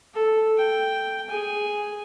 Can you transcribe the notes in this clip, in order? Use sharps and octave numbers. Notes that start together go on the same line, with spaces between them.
A4
G5
G#4 G#5